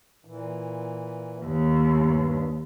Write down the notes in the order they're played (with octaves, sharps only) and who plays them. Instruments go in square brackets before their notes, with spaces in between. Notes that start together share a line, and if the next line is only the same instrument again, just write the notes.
[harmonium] A#2 E3
[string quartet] D#2
[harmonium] G2